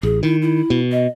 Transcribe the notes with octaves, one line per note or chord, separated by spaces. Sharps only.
A1 G#4
D#3 E4
E4
B2
D#5